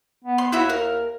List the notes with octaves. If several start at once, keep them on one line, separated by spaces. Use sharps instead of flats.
B3
C6
D#2 E4 F#4 E5
A#4